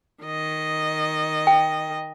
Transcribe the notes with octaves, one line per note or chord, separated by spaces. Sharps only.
D#3 D#5
G5